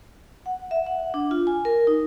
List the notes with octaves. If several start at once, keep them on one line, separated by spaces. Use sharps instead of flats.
F#5
E5
F#5
D4
F4
G#5
A#4
D#4